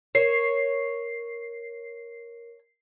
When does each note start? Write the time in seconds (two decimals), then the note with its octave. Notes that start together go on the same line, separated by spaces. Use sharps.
0.15 A#4 C#5 C7